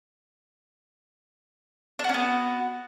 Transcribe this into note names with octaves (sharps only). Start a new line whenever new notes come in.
B3 C#4 D4 F#4